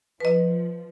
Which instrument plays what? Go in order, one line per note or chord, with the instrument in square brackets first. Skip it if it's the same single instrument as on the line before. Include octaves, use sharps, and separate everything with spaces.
[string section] F3 [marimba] B4 D#5